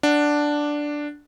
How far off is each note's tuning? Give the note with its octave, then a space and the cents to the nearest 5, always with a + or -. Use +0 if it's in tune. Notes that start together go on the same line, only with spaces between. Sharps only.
D4 +0 F#5 +0